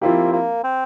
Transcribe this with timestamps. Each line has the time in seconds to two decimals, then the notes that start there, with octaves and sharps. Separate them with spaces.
0.02 F3 A#3 C4 E4 G4
0.33 A#3
0.64 C4